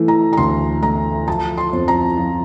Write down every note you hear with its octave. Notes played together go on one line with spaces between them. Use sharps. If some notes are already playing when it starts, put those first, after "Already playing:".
Already playing: E3 A3
A#5
A#5
D2 C6
A3 A#5
F3 A5
C6
F2
A#5
F3